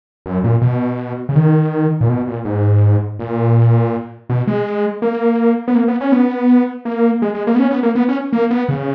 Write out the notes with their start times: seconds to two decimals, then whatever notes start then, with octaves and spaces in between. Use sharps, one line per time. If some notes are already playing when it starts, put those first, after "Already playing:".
0.26 F#2
0.44 A#2
0.62 B2
1.29 C#3
1.36 D#3
2.01 A#2
2.09 B2
2.27 A#2
2.45 G#2
3.19 A#2
4.29 B2
4.47 G#3
5.02 A#3
5.68 B3
5.75 A#3
5.88 B3
6.01 C#4
6.12 B3
6.85 A#3
7.22 G#3
7.35 G#3
7.47 A#3
7.55 B3
7.59 C#4
7.71 B3
7.83 A#3
7.95 B3
8.09 C#4
8.33 A#3
8.51 B3
8.69 C#3